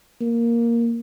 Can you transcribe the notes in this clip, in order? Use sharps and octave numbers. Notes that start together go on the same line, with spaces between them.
A#3